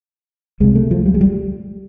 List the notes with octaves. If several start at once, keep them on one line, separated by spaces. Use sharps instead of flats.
C#2 C3 G#3
A3
F3
G3
G#3
G3